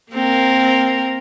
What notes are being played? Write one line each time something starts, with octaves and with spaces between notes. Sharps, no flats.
A#3 C4 A#4